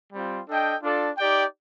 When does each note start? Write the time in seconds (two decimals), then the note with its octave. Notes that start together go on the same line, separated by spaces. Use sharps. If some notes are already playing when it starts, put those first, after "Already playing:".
0.13 G3 C4 F4
0.48 D4 A4 D#5 G5
0.82 D4 F4 A4 D5
1.17 D#4 G4 D5 G5